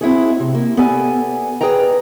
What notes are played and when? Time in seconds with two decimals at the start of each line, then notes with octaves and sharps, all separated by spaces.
0.01 C4 E4 F#4 G#4
0.37 A2 C3
0.55 A#3
0.77 B3 G4 A4 D5 G#5
1.61 G#4 B4 D5 G5 A#5